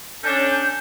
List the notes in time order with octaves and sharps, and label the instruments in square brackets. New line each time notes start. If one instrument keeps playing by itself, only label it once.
[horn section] C#4 D4 A4 [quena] G6